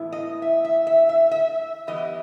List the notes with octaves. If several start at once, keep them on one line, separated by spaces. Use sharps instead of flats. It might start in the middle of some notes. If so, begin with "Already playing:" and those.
Already playing: A2 E3 G#3 B3 E4
D#5
E5
E5
E5
E5
E5
E3 G3 B3 E4 D#5